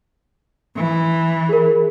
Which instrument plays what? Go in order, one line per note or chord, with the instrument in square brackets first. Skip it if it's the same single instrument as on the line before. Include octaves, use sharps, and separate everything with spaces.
[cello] E3
[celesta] G#4 A#4